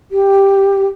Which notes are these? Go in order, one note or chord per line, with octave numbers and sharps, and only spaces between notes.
G4